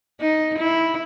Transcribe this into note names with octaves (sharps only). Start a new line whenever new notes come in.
D#4
E4